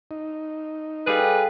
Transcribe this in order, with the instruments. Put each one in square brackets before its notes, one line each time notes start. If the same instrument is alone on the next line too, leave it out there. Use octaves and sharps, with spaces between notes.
[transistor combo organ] D#4
[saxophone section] G3 B4 [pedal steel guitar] G#4 [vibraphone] A4 F5 G5